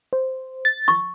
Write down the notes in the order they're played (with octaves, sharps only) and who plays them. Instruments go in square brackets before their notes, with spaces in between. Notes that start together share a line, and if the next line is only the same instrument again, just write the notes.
[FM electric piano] C5
A6
[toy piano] C#6